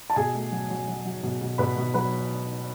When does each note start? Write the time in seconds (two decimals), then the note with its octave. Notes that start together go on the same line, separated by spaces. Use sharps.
0.10 A5
0.16 B2 G#4 G#5
0.35 A3
0.52 F#3
0.70 F#3
0.88 F#3
1.05 F#3
1.23 B2
1.41 B2
1.58 B2 B4 B5
1.77 B2
1.94 F#3 B4 B5